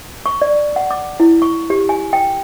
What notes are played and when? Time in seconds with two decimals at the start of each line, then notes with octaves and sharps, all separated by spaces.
0.26 C#6
0.42 D5
0.76 F#5
0.91 D6
1.20 E4
1.42 C#6
1.70 G4
1.89 G#5
2.13 G5